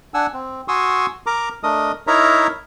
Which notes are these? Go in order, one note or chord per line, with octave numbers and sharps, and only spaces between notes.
D4 F#5 G#5 E6
C4
F#4 G#5 C6 C#6 D#6 E6
A#4 A#5 D6
A3 D4 A#4 D#5 D#6
D#4 E4 A#4 C#5 E5 A#5